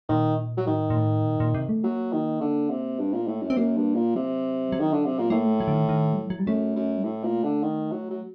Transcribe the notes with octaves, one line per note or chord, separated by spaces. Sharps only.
A#2 D#3
F#3
A2 D#3
A#2
A2
A#2
A#2
C3
A3
F#3 A#3
D#3
D3
C3
G2 C4
A#2
A#3
A2
F#2
C4
F#2 A#3
G2
A#2
C3 F#3
F#3
D#3
D3
C3
A#2
A2 A#3
A3
F#3
D3
D#3
D#3
G3
F#3
F#3
G3
F#2 A3
F#2
G3
A2 A3
A#2
D3
D#3
F#3
F#3